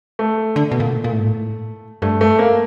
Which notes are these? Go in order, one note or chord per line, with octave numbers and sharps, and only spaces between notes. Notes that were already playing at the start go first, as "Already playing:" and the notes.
A3
D3
B2
A#2
A#2
A2
G#2
A2
G2 A3
A3
A#3